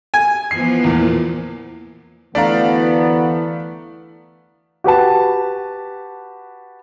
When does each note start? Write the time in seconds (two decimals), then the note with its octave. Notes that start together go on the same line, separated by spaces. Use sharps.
0.14 G#5
0.51 E3 F3 B3 C7
0.84 E2 A#2
2.35 D2 E3 A3 B3 D4 D5 F5 A#5
4.84 F#4 G4 B4 A5